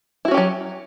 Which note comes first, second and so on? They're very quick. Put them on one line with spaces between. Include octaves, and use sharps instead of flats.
E4 F#4 C#4 G4 F#3